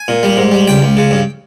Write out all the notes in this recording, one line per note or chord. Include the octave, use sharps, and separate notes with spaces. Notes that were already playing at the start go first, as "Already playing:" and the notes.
Already playing: G#5
A#2
G3
G#2
G3
C#2 G5
C#2
C#3
G2